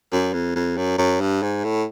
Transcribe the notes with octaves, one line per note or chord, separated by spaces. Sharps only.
F#2
F2
F2
F#2
F#2
G2
G#2
A2